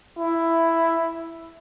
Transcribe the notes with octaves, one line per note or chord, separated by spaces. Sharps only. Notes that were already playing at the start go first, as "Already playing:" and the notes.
E4